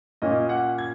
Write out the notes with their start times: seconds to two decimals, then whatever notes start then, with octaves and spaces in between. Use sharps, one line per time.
0.22 A#2 A#3 C#4 D#5
0.49 F#5
0.78 G#6